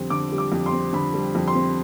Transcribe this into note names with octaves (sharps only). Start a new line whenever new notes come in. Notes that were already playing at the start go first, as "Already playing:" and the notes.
Already playing: F2 D3 G3 C4
D3 D6
G3
D6
F2
C6
C4
D3 B5
G3
F2
C6
C4